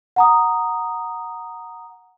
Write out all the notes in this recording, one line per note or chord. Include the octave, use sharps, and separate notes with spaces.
F#5 A#5 D#6